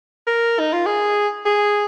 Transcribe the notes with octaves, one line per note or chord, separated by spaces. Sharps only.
A#4
D#4
F4
G#4
G#4